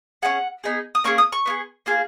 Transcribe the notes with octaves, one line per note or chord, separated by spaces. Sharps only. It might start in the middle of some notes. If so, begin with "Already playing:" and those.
C#4 F4 G#4 F#5
B3 D#4 G#4
D#6
A#3 C#4 G#4 C#6
D#6
C#6
B3 F4 G#4
A#3 F4 G#4